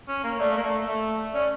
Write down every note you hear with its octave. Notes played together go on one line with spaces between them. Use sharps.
C#4
A#3
A3 D5
A#3
A3
A3
C#4 D5